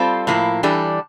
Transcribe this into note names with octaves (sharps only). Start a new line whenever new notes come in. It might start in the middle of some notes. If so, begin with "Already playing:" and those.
Already playing: G3 C4 F4 A4 C5
A2 F3 A#3 E4
E3 G3 D4 A4